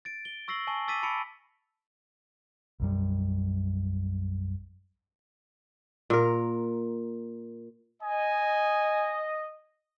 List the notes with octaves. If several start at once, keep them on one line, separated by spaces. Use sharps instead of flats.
A6 D7
G7
C#6 E6 A#6 C7 F#7
G#5 A5 C#6 G7
D6 E6 A6 B6 D#7
A5 B5 C#7 D7
B1 F#2 G3
A#2 A#4
D#5 G#5